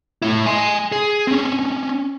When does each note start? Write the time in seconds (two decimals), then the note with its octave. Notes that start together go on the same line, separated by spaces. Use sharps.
0.22 A3 E4
0.46 G#5 C6
0.92 G#4
1.27 C4 C#4